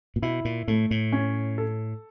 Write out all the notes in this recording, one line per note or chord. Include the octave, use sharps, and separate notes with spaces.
A#2
B2 E4
A#2
A2 A3
A2
C#4
A4